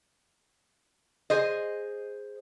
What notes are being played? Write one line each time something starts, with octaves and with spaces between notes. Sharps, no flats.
G#4 C5 D#5